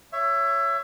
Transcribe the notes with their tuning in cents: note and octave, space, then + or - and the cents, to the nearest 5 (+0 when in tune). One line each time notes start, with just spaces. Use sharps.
C#5 +0 E5 +25